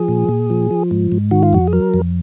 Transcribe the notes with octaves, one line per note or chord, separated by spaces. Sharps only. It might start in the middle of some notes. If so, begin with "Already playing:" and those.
Already playing: F3 G#4
A#2
A#2
F3
F3
G#2
G#2
D#3 F#4
F4
F2 F#4
G#4
F#3 A#4
F2